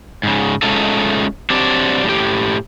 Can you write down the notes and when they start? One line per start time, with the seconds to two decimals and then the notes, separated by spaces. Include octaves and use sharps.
0.23 G#2 C#3
0.63 G#3 A3 C#4 D#4 F4 A4
1.50 F#3 C4 D4 G4 D5
2.05 A2 G4